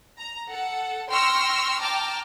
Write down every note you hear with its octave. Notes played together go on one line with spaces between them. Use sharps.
A#5
A4 F#5
G5 C6 C#6 E6 F6 A#6
G5 A5 A#5 D6 F6